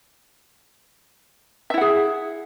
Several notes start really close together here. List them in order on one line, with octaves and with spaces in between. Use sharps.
E5 E4 F#5 G#4